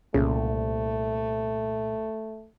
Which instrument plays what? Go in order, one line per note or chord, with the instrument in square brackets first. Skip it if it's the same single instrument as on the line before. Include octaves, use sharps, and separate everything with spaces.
[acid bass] C2 [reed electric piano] A#2 [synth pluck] C#3 [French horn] A3